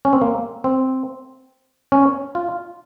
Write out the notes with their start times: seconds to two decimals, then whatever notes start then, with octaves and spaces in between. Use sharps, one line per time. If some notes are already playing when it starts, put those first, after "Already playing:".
0.05 C#4
0.13 C4
0.21 A#3
0.64 C4
1.92 C#4
2.35 F4